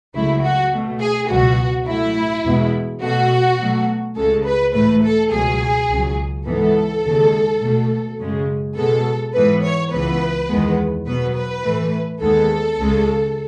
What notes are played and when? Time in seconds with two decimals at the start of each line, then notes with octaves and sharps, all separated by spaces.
0.14 C#2 C#3 F#3 A3 E4
0.42 F#4
0.71 B2 A3
1.00 G#4
1.29 C#2 B2 F#3 B3 F#4
1.86 A2 F#3 A3 E4
2.44 E2 B2 G#3 B3
3.01 B2 A3 F#4
3.58 B2 F#3 A3
4.16 C#2 C#3 G#3 A4
4.45 B4
4.73 A2 E3 A3 B4
5.03 A4
5.31 C#2 B2 F#3 G#4
5.89 C#2 C#3 F#3
6.46 G#2 E3 B3 A4
7.04 D#2 C#3 G#3
7.61 B2 A3
8.19 F#2 C#3 G#3
8.75 B2 G#3 B3 A4
9.34 G#2 E3 B3 B4
9.63 C#5
9.91 C#2 C#3 E3 B3 B4
10.48 E2 D#3 G#3 B3
11.06 B2 F#3 B3 B4
11.34 B4
11.64 A2 E3 A3
12.21 D#2 D#3 G#3 B3 A4
12.79 C#2 C#3 G#3